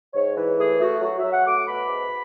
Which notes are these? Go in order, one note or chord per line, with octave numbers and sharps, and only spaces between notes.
G#2 C#5
E3
A3 G#4
A3 F#4
F#3 F#4
E5
F#3
F#5
A3 D6
B2 B5
G#2